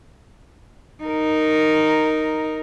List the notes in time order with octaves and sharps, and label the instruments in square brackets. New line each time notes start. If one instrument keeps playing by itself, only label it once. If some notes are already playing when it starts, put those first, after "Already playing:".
[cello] D#4 A#4